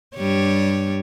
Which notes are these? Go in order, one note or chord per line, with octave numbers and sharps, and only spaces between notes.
G2 G3 C#5